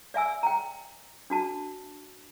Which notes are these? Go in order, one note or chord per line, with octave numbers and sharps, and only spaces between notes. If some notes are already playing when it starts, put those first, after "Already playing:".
D5 E5 G#5 E6
G5 A#5
D4 F#4 A5